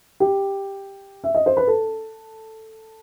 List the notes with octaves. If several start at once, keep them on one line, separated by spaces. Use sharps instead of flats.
G4
E5
D#5
C5
B4
A4